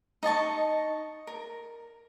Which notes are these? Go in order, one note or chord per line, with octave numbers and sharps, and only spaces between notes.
D#4 D#5 A5 C#6
A#4